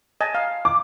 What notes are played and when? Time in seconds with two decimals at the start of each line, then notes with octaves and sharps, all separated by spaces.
0.21 D#5 G#5 A5
0.35 F5
0.65 D6